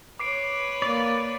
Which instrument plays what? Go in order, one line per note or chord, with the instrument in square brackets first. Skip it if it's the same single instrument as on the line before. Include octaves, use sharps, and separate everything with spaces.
[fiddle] B4 C#5 [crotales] D6 C7 D7
[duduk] A#3 [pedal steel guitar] D5